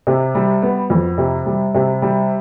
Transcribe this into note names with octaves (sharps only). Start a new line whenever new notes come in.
C3
G3
B3
F2
C3
G3
C3
G3